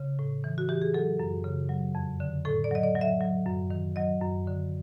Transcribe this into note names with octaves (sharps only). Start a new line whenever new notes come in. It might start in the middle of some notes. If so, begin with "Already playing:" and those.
Already playing: C#3
A2
E3
F#4
E3 G4
G#4
F#3 A4
F#2
C#3
F#3
F2
D3
A2 A4
D5
F#3 D#5
D5
F#3
E5
F#3
F#2
D#3
F#3 D#5
F#2
D3